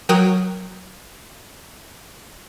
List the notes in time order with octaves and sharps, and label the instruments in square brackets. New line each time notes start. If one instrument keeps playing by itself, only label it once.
[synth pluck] F#3 A#4 G5 D#6 F#6